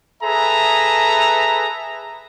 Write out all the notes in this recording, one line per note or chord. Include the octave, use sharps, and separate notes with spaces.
G#4 A4 B4 E5 A#5